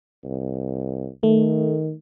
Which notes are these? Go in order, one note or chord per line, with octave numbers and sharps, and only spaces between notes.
C2
D#3 A3